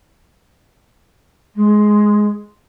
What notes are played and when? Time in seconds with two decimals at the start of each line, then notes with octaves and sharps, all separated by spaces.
1.55 G#3